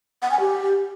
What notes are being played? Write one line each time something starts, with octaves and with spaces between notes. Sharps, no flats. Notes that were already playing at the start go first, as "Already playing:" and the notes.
F#5
G#5
G4